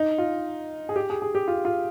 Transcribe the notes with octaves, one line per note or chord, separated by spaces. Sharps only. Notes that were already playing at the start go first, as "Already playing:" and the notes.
Already playing: D#4
F4
G#4
G4
G#4
G#4
G4
F4
F4